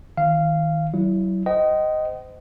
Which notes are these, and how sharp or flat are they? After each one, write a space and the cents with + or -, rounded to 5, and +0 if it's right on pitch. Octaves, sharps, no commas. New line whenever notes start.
D#3 +20 F5 -15
F#3 +35 E4 +0
C5 -30 D#5 +0 G5 -45